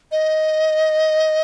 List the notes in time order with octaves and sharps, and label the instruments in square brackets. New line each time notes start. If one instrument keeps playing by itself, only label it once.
[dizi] D#5